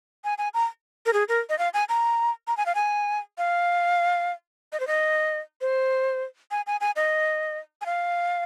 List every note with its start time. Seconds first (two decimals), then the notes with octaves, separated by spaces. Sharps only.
0.24 G#5
0.38 G#5
0.54 A#5
1.06 A#4
1.13 G#4
1.29 A#4
1.49 D#5
1.59 F5
1.74 G#5
1.89 A#5
2.47 A#5
2.57 G#5
2.66 F5
2.75 G#5
3.38 F5
4.72 D#5
4.80 C5
4.87 D#5
5.61 C5
6.51 G#5
6.67 G#5
6.81 G#5
6.96 D#5
7.81 G#5
7.86 F5